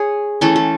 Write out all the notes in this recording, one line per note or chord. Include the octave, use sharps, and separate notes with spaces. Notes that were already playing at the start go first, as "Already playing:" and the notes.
Already playing: G#4 C#5
E3 A3 C#4 A4
A4